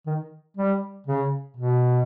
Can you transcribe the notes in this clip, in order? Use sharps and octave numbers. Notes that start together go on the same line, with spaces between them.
D#3
G3
C#3
B2